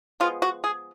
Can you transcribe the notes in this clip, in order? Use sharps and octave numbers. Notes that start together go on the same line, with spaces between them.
F3 G#3 B3 F4
F#4
G#4